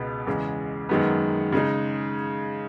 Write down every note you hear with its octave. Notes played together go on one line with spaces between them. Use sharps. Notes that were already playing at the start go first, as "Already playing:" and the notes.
Already playing: C#2 B2 G#3 B3
E2 C#3 G#3
F#2 D#3 G#3 B3
C#3 G#3 D#4